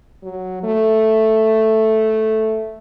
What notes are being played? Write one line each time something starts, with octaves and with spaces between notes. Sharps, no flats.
F#3
A3